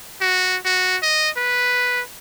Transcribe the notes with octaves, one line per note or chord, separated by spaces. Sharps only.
F#4
F#4
D#5
B4